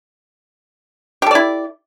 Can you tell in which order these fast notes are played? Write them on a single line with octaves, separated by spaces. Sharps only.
G4 A4 D5 E4